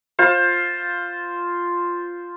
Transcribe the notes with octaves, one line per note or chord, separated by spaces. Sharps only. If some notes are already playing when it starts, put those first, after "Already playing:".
F4 C5